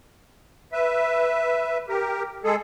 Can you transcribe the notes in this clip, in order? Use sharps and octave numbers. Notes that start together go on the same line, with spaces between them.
B4 E5
G4 A#4
G#3 G#4 A4